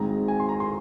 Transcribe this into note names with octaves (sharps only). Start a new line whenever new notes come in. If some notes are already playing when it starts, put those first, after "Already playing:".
Already playing: G#1 G#2 G#3 C4 A#5
G#5
C6
A#5
C6